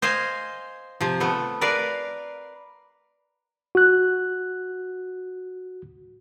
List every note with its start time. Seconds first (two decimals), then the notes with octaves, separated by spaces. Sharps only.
0.02 C5 D#5 F5 G#5
1.01 C3 F3
1.20 A3 B3
1.61 A#4 B4 D5 F5
3.75 F#4 F#6